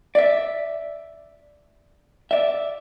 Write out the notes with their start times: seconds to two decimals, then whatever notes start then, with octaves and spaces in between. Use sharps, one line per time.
0.15 D5 E5
2.31 D5 E5